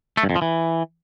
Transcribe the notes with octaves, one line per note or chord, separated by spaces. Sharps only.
A3
G2
F2
F3
E3